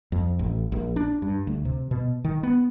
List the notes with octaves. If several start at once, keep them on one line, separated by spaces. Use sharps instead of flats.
F2
A1
A#1
D4
G2
D2
C3
B2
D#3
B3